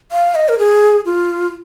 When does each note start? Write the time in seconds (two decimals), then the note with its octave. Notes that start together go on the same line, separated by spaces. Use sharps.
0.12 F5
0.35 D#5
0.49 A#4
0.59 G#4
1.06 F4